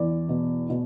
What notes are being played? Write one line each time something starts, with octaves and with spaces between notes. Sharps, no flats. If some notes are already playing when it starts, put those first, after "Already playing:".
Already playing: E2 D5
B2
B2